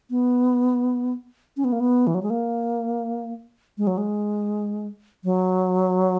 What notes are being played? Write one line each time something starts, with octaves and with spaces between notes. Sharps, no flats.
B3
C#4
B3
A#3
B3
E3
F#3
G#3
A#3
G#3
F#3
G#3
F#3